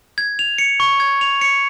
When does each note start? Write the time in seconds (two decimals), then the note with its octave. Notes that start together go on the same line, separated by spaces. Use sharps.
0.18 G#6
0.39 F7
0.58 C#7
0.80 C#6
1.00 G#6
1.21 F7
1.41 C#7